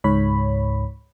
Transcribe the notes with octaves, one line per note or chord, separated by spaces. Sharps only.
C#2 G#2 C#5 B5